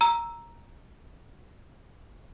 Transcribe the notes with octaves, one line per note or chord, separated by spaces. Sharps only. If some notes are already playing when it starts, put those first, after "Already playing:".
A#5 E6